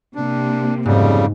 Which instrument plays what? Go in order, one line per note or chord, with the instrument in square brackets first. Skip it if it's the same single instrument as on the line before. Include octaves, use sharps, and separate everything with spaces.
[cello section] C3 A#3 [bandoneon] D4
[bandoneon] F2 C#3 G3 [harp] G#2